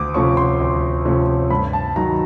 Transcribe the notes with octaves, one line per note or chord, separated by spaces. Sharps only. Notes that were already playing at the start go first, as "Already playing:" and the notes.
Already playing: D2 D6 D#6
C3 F3 A3 C#4 C#6
C6
D2
C3 F3 A3 C#4
G2 B5
A5
D#3 F#3 A#5